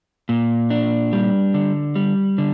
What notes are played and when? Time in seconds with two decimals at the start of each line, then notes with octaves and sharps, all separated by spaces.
0.29 A#2
0.70 D4
1.13 G3
1.54 D3
1.96 G3
2.38 D3